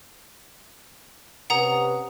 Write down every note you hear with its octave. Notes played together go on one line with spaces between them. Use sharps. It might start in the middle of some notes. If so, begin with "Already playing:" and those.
C3 C#4 B4 F#5 A#5 D#6